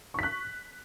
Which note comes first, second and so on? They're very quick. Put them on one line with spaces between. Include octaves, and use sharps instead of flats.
C#6 B6 F#6